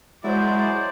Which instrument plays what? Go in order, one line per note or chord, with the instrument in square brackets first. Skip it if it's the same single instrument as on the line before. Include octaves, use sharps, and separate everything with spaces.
[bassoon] F#3 [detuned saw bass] G#3 [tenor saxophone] E4 [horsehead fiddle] C5 D5